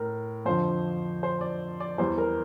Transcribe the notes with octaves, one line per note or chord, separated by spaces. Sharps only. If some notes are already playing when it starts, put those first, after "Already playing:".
Already playing: A2 A#4
F2 D3 F3 C5
C5
D5
D5
E2 E3 G3 C5
A#4